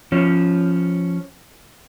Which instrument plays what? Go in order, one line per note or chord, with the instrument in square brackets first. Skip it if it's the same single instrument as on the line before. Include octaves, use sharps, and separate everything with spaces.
[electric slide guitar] F3 C#4